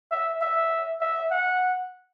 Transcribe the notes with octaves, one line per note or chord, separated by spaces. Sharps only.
E5
E5
E5
F#5